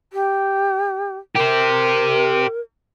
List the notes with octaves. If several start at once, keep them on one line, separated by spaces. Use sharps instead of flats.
G4
G4 A#4 C5